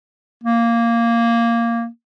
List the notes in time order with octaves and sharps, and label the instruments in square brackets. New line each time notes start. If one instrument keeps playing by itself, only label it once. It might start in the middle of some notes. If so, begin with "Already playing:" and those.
[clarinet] A#3